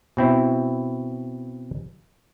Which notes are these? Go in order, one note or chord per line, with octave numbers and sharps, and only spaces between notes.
B2 C4 E4